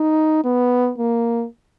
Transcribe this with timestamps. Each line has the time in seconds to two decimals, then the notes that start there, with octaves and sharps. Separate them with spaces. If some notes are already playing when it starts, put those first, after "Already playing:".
Already playing: D#4
0.44 B3
0.98 A#3